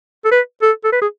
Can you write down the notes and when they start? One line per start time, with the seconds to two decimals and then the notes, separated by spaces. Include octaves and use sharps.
0.25 A4
0.31 B4
0.62 A4
0.84 A4
0.92 B4
1.02 G#4